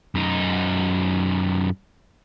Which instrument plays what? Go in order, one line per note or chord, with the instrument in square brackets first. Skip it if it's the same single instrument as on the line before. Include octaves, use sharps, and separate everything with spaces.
[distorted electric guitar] F#2 D#4